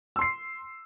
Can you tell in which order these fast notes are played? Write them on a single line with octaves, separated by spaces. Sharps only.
E6 C6 C7